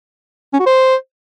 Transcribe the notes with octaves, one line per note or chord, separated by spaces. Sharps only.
C#4
F#4
C5